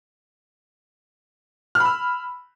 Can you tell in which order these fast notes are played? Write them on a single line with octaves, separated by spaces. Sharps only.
F6 B5 E6